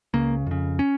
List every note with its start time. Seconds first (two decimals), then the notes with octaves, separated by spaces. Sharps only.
0.14 C#2 C#3 A#3
0.47 F2 C#3
0.79 C#4